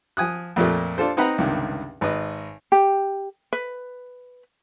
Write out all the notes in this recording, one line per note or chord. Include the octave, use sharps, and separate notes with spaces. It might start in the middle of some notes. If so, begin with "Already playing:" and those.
F3 G#5 D#6 F#6
F2 A#2 F3 A3 A#3
D4 F4 A4 C5
C4 D#4 B4 F#5 A#5 B5
C#2 G2 C3 D#3
G#1 B4 D#5
G4
B4